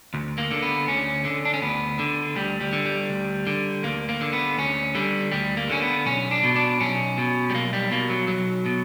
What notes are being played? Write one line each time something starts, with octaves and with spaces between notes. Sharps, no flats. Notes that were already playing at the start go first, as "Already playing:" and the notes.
D2
A#3
D3
B3
D2 C#4
D3
D4
C#4
D2 B3
D3
D2 G3
G3
D3
G3
D2
D3
D2 A#3
A#3
D3
B3
D2 C#4
D3 G3
D2 G3
A#3
D3 C#4
B3
B1 C#4
D4
B2
D4
B1 C#4
B2
G3
B1 A#3
G3
B2 A#3
F#3
B1 F#3
B2